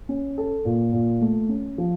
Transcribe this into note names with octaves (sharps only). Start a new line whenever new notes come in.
C#4
A4
A#2
A#2
A3
C#4
F3